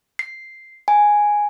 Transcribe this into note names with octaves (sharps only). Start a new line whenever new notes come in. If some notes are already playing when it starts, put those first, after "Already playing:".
C7
G#5